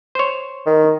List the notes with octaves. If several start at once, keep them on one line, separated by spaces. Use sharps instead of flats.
C5 C#5
D#3